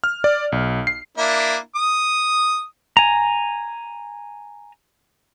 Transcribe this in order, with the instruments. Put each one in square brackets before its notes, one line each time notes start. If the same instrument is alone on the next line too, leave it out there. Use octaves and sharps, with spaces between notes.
[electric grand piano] F6
D5
B1
C7
[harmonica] A#3 D4 E4
D#6
[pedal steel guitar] G#5 A#5